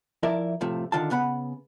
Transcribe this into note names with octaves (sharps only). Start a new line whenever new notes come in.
F3 E4 A#4 D5 E5
A2 C3 F3 A3
D3 D#3 F4 A5
C#3 B3 F#5 B5